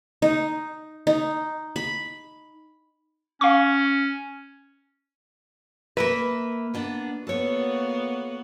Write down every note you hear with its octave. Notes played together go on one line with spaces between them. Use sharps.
D#4
D#4
B5
C#4 F5 C#6
A#3 A#4 B4 E5
A#3 B3 D4
A#3 B3 F#4 A4 C#5